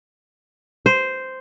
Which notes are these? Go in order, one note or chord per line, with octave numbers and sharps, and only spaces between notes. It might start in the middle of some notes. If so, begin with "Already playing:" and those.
C5